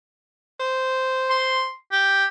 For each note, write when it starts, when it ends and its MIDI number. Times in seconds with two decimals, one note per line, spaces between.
0.60 1.67 72
1.30 1.73 84
1.91 2.25 67